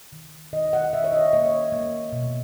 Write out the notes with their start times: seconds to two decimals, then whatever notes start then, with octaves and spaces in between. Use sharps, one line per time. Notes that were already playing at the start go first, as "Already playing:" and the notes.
0.12 D#3
0.53 D#3 D#5
0.73 F#5
0.93 D#3 E5
1.04 C#5
1.12 D#5
1.33 A#3 C#5
1.72 A#3
2.12 B2